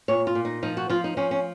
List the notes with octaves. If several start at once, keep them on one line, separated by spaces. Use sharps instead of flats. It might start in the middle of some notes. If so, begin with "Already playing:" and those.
A#2 C#5
F4
A#2
D#4
F3 D#4
F#4
F3 F4
D#4
F3 C#4
C#4